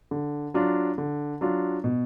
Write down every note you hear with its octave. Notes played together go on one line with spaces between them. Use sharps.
D3
F#3 D4 F4
D3
F#3 D4 F4
B2